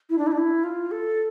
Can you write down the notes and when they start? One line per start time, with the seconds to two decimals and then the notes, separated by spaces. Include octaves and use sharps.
0.10 E4
0.18 D4
0.27 E4
0.32 D4
0.38 E4
0.64 F4
0.91 A4